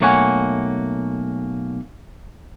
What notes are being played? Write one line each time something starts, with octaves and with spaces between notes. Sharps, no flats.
B1 A3 A#3 C#5 F#5 G#5